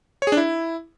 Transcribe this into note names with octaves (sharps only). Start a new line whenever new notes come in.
C#5
G#4
D4
E4